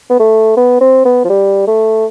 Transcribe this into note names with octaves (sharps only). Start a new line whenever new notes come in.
B3
A3
B3
C4
B3
F3
G3
A3